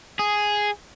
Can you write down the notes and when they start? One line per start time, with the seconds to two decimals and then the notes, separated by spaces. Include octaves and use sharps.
0.19 G#4